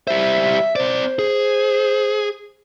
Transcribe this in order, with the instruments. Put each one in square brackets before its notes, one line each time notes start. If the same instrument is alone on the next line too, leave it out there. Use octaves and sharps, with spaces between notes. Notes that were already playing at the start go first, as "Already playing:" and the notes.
[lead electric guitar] G3 C5 [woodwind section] E5
[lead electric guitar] C4 D5 [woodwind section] C5
[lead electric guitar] G#4